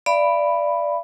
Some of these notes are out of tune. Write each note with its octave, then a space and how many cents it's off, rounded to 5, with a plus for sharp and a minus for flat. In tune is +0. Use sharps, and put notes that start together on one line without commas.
D5 +0 F5 -45 B5 +0